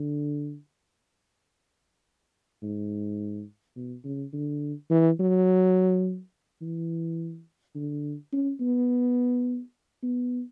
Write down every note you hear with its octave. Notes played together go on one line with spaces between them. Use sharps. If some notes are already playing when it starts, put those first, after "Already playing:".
Already playing: D3
G#2
B2
C#3
D3
E3
F#3
E3
D3
C#4
B3
B3